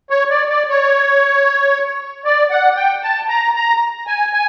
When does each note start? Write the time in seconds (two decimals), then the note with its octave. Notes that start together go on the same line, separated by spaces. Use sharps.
0.10 C#5
0.30 D5
0.49 D5
0.69 C#5
2.25 D5
2.51 F#5
2.76 G5
3.03 A5
3.29 A#5
3.55 A#5
4.07 G#5
4.33 G#5